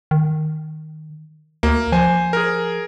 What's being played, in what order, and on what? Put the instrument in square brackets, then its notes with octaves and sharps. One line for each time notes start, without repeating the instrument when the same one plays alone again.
[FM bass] D#3
[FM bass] D2 [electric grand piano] A#3
[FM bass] F3 [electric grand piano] C5 G#5
[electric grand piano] G#4 A#4